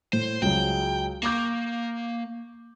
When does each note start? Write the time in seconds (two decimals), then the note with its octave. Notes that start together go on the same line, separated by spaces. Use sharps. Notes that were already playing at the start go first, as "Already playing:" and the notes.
0.13 A2 C5
0.42 C#2 F#3 G#3 G5
1.23 A#3 C#6 D6 G6